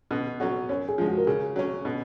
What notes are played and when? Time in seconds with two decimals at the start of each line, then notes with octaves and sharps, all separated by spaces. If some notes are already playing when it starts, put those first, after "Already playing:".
0.11 B2
0.40 F#3 C#4 F#4
0.69 F#2 C#5
0.88 G#4
0.98 F3 G#3
1.07 F#4
1.18 A#4
1.27 C#3 G#4
1.56 F#3 C#4
1.85 B2